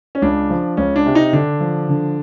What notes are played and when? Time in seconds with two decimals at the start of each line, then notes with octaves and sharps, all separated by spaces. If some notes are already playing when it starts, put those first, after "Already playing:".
0.15 C#4
0.22 C#2 D4
0.50 F3
0.77 C#2 C#4
0.96 D4
1.06 C3
1.15 D#4
1.33 D3 D4
1.60 F3
1.89 D3